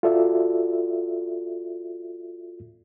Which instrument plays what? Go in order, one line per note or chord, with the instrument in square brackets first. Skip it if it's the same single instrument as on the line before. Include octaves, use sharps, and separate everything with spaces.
[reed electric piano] F4 F#4 A4 D5 E5